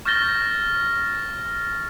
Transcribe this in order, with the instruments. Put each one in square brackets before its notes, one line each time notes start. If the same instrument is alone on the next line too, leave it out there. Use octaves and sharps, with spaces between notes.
[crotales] C#6 F6 G6 A6 A#6 G7